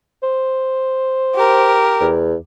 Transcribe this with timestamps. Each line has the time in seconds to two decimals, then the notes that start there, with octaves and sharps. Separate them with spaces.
0.23 C5
1.35 G4 A#4
2.01 E2